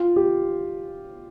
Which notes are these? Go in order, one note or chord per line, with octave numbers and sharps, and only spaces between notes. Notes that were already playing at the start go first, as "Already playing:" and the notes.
Already playing: F4
G4